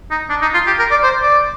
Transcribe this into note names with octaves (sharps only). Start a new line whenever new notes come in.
D#4
D4
D#4
F4
G4
A#4
D5
C5
D5